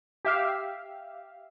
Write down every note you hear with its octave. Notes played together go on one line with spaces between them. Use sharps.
G4 E5 F5